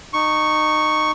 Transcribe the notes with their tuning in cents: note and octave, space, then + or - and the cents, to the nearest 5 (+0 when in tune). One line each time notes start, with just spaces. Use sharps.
D#4 -20 C#6 +0